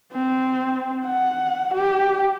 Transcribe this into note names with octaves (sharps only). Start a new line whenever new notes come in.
C4
F#5
G4